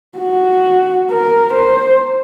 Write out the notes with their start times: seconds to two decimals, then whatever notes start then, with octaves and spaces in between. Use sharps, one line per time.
0.18 F#4
1.11 A#4
1.54 C5